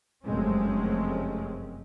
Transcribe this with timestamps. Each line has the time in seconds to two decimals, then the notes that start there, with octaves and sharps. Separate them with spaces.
0.24 F1 F#2 G#3 A3 C4 C#4